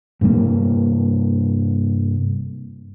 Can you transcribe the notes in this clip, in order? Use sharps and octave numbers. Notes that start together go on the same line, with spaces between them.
G2 C3 G3 A#3